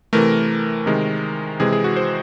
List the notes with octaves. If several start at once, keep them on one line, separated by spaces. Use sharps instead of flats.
C3 E3 A3 A#4
C3 D#3 G#3 A#4
C3 E3 G#3 G#4
G#4
F#4
C5